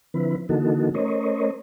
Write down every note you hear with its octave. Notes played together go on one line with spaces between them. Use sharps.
D3 F3 C4 E4 B4
D3 E3 A#3 D#4 F#4 A4
A3 C#4 A#4 C5 C#5 D#5